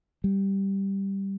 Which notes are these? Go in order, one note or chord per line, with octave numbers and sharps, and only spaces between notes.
G3